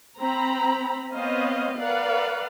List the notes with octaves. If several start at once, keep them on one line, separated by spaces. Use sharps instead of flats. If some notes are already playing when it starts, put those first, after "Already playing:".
C4 A#5 B5
B3 C4 C5 C#5 D#5 F5
A#4 B4 D5 F5 F#5